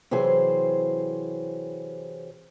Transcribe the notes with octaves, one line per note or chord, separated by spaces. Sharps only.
C3 E3 F#3 G#4 C5